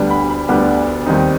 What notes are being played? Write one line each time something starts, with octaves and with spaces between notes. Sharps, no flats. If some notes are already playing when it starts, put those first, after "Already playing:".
Already playing: D2 D3 G3 B3 D4
B5
B5
D2 D3 G3 B3 D4
D#2 D#3 G3 C4 D#4